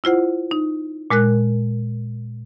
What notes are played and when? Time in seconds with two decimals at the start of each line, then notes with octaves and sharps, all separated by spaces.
0.04 E4 F4 C5 F#5
0.51 D#4
1.10 A#2 G#3 A#4 F#6